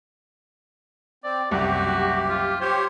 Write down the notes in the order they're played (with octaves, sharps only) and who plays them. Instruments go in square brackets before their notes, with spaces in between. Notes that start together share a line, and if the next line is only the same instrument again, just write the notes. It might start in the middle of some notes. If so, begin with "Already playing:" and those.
[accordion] C4 [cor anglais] D5
[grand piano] F#1 C2 [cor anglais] F#4 [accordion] G4
[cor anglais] F#4
F4
[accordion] G4 C#5 [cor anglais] C5